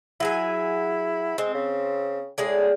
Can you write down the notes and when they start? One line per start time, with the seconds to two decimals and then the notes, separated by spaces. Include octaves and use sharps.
0.20 F#3 E4 G#4 G#5
1.38 G#3 C4
1.55 C#3
2.38 A2 G#3 G#4 D5